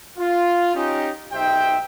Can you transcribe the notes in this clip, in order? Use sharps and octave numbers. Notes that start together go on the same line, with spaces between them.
F4
C#4 D#4 G4
B1 D#4 G4 C5 E5 G5